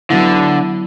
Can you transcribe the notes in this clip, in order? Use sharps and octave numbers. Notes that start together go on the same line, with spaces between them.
D3 F#3 B3 E4